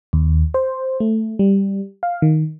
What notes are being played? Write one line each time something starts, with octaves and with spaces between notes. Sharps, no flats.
D#2
C5
A3
G3
F5
D#3